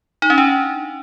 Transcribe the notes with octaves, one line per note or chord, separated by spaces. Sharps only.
D#4
C#4
D4